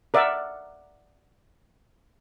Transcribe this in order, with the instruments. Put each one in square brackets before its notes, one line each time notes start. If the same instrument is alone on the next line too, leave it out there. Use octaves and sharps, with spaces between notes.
[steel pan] A#4 D5 E5 F#5